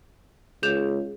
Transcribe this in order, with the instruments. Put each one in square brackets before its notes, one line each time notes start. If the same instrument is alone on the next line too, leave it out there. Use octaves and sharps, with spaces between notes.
[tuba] C#2 [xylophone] G#4 G6 F7